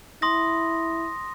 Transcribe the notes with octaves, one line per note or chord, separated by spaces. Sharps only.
E4 C6 D#6 A#6